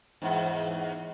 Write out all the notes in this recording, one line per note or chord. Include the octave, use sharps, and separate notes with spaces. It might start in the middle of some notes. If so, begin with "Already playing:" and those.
E2 G#2